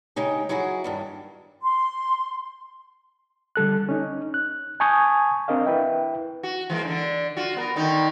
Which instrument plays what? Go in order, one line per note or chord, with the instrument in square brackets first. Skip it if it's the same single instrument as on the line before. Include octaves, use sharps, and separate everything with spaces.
[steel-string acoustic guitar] C#3 G#3 D#4 G4
F#3 D#4 E4 F#4 G#4
G2 D#3 G3
[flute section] C6
[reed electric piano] D3 G3 A4 F#6
C#4 D#4
F#6
G#5 A5 C#6 D#6 G6 G#6
C4 D4 A#4 D#5 F5
E4 B4 E5 G5
[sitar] F#4
E3 G#3 A#3
D3 D4
F4 F#4
B3 A#4
D3 D#3 D#4